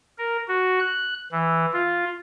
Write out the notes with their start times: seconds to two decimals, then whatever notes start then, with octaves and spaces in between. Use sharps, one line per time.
0.18 A#4
0.48 F#4
0.80 F#6
1.32 E3
1.73 F4